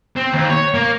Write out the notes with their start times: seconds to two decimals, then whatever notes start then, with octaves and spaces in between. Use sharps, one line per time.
0.16 C4
0.33 D#2
0.50 C#5
0.74 A#3